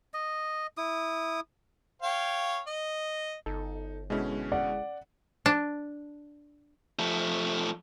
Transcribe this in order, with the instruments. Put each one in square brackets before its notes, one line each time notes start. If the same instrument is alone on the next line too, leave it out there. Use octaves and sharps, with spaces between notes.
[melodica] D#5
E4 D#6
[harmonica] C#5 F5 G5
D#5
[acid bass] G1 [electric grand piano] D#4 [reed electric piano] A4
[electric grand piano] B2 D3 C#4 [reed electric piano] G#3 E4 G#4
[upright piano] D5 F#5
[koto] D4
[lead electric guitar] F3 A3